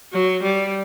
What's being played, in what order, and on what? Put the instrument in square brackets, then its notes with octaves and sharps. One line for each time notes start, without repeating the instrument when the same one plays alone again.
[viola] F#3
G3